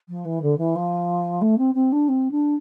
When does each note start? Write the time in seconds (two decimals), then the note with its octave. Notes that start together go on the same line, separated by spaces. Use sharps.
0.09 F3
0.25 E3
0.42 D3
0.58 E3
0.76 F3
1.41 A3
1.58 C4
1.75 C4
1.92 D4
2.09 C4
2.31 D4